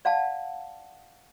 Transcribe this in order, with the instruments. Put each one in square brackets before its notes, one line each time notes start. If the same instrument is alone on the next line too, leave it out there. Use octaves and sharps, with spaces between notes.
[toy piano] D5 F5 F#5 A5